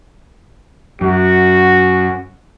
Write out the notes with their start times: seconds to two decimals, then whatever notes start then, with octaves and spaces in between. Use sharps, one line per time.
1.01 F#2 F#4